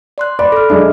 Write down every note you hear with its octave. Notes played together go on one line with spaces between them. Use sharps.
D5 C6 F#6
D5 B5 D6
A4 F6
G#3 D4 E5